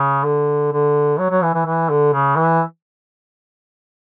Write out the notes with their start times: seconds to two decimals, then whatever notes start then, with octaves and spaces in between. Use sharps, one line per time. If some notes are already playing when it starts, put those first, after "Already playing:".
Already playing: C#3
0.25 D3
0.73 D3
1.19 F#3
1.30 F#3
1.42 E3
1.54 E3
1.65 E3
1.90 D3
2.13 C#3
2.37 E3